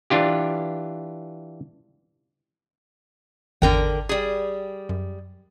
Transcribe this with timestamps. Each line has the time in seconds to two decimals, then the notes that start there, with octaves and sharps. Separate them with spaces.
0.10 E3 D4 F4 G4
3.62 G#1 E2 D3 A#4 G5
4.09 G3 G#4
4.89 F#2